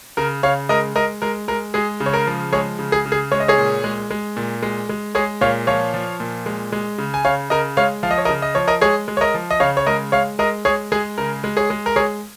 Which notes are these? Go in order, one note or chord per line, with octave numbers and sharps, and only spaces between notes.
C#3 A#4
C#3 C#5 F5
G#3 A#4 D#5
G#3 A#4 D#5
G#3 A#4
G#3 A#4
G#3 G#4
C#3
C#5
A#4
F3
G#3 G#4 C#5
C#3
G#4
C#3
G#4
G#3 C#5
D#5
G#4 C#5
A#2
G#3
G#3
A#2
G#3
G#3
G#3 G#4 C#5
A#2 C#5 F5
F3 C#5 F5
F3
A#2
G#3
G#3
C#3
G#5
C#3 C#5 F5
C#3 A#4 D#5
G#3 C#5 F5
F3 F5
D#5
C#5
A#4 D#5
C#3
D#5
F3 C#5
A#4 D#5
G#3 G#4 C#5
G#3
C#5
A#4 D#5
F3
D#5
C#3 C#5 F5
C#5
G#3 A#4 D#5
G#3 C#5 F5
G#3 A#4 D#5
G#3 G#4 C#5
G#3 G#4
C#3 A#4
G#3
G#4 C#5
G#3
A#4
G#3 G#4 C#5